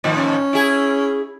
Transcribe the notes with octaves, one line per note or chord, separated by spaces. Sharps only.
A2 D#3 F3
C#4
E4 G#4